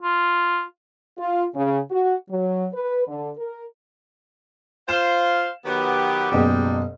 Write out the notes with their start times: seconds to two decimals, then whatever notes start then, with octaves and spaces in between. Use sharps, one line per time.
0.02 F4
1.18 F4
1.55 C#3
1.90 F#4
2.30 F#3
2.73 B4
3.07 D3
3.37 A#4
4.89 F4 C5 F5 E7
5.65 D#3 F#3 B3 G4
6.32 F#1 G#2 B2 G3 G#3